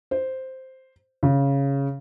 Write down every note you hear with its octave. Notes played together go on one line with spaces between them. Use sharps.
C5
C#3